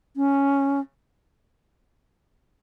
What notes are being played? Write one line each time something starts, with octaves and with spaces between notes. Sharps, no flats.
C#4